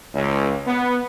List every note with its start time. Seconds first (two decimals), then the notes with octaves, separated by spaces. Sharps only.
0.14 C#2
0.66 B3